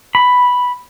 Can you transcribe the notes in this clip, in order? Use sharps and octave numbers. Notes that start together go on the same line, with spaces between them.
B5